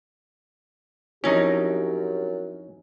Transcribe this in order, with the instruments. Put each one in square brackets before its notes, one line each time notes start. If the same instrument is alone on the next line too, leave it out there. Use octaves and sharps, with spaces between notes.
[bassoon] F#2 [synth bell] F3 C4 E4 [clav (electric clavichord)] C#4 D#4 [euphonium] G4